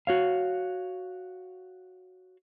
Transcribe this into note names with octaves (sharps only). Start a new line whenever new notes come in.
F#4 C#5 F5